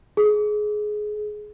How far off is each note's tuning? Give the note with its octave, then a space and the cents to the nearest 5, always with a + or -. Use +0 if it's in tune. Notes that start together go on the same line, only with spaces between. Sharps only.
G#4 +20